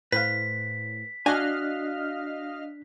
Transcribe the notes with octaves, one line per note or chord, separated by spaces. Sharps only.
A2 B4 C5 F5 B6
D4 F#4 D#5 F5 G#5 F6 F#6